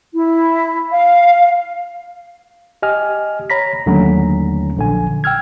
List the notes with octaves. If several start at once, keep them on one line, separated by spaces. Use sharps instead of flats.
E4
F5
G4 D#5 G#5 F6
C#5 A#5 B5 A#6 B6
D#2 D3 F#3 A3 C#4 A#5
A#1 D3 G#5
G5 E6 F6 G#6